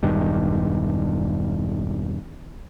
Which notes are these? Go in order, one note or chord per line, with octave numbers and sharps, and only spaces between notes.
E1 G2 D#3